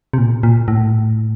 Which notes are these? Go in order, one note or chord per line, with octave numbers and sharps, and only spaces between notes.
C3
A#2
A#2
A2